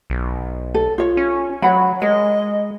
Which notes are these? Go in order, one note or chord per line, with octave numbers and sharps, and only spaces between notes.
B1
A4
F4 C#5
C#4
F#3 C#5 F#5 B5
G#3 A#4 D#5